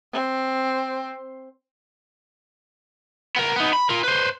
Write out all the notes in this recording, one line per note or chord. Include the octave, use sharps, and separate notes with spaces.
C4
B3 A#4
B3 D#4
B5
F4 A#4
B4 C5